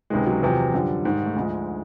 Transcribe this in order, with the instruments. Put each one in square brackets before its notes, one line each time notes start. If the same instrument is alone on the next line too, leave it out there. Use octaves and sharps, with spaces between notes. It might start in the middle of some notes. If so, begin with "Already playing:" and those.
[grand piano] C#2 C3 D#3 G#3
F#3
E2 C3 F3
F#2 D3 F3 G3
G#2 D#3
A3
D2 D3 F3 G#3